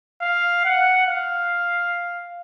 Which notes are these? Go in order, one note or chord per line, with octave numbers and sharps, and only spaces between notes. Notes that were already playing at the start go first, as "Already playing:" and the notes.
F5
F#5
F5